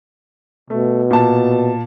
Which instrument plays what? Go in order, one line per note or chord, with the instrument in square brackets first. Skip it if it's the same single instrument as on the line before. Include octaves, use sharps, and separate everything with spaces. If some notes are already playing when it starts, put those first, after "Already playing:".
[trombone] B2 [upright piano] A3
[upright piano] A#2 A5